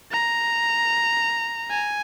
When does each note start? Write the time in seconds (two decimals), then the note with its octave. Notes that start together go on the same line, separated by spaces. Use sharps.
0.12 A#5
1.70 G#5